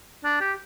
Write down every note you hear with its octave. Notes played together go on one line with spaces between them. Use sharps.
D4
G4